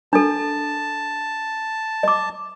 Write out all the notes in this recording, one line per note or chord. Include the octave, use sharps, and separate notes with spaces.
D4 A4 A5
D#5 D6